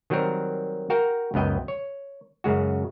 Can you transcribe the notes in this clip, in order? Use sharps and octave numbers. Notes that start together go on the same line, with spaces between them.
D#3 F#3 G3 C4 A#4
F#4 A#4 F5 G5
C#2 F#2 B3 D#5 G5
C#5
F#2 C#3 G#3 F#4